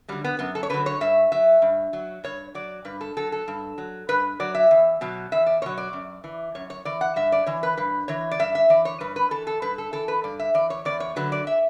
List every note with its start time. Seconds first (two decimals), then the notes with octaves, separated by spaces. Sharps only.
0.08 D3 F#3 G3
0.24 B3
0.39 F#2 B3
0.55 A4
0.63 C#5
0.70 D3 F#3 B4
0.86 C#5
1.01 G2 E5
1.32 F#3 E5
1.62 G2
1.93 F#3
2.24 G2 C#5
2.55 F#3 D5
2.85 G2 B4
3.01 A4
3.17 F#3 A4
3.32 A4
3.48 G2
3.78 F#3
4.09 G2 B4
4.40 F#3 D5
4.55 E5
4.71 E2
5.01 B2 F#3
5.32 E2 E5
5.46 D5
5.62 B2 F#3 C#5
5.78 D5
5.93 F#2
6.24 E3
6.55 F#2 C#5
6.70 C#5
6.85 E3 D5
7.01 F#5
7.16 G2 E5
7.32 D5
7.46 E3 C#5
7.63 B4
7.77 G2 B4
8.08 E3 C#5
8.31 D5
8.39 G2 E5
8.55 E5
8.70 E3 D5
8.85 C#5
9.00 G2 B4
9.16 B4
9.31 E3 A4
9.47 A4
9.62 G2 B4
9.78 A4
9.93 E3 A4
10.08 B4
10.24 G2 D5
10.39 E5
10.54 E3 D5
10.70 C#5
10.85 E2 D5
11.00 C#5
11.16 D3 F#3 B4
11.32 D5
11.47 E5